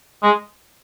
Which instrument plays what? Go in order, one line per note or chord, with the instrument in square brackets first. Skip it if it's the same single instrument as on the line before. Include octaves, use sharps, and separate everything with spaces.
[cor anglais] G#3